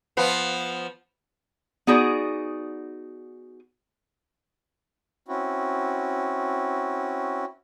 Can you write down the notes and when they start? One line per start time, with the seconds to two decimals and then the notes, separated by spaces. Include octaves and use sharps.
0.17 F3 B3
1.87 B3 D#4 F#4 G#4 D5
5.28 C4 C#4 E4 F#4